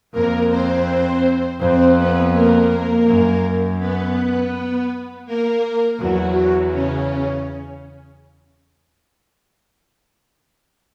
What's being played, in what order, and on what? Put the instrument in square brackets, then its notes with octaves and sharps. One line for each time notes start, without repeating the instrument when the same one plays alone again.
[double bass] F2 [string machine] A#3 A#4
[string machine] C4 C5
[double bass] F2 [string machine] C4 C5
[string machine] B3 B4
A#3 A#4
[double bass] F#2
[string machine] B3 B4
A#3 A#4
[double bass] E2 [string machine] F#3 F#4
[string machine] C#3 C#4